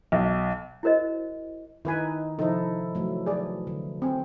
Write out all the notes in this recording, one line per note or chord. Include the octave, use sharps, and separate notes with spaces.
B1
E4 F#4 A#4 C5 D#5
D#3 D#4 E4 B4 G#5
C3 F3 D#4 E4 A4 C5
E3 F#3 A3
G#4 D5
D3
C4 C5 G#5